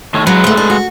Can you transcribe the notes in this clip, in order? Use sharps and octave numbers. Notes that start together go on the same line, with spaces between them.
D#3 A3 C#5
F#3 G#3 B4
D2 A3
D4
F#4